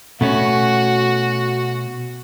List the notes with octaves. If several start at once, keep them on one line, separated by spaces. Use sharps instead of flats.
B2 A3 C#4 F#4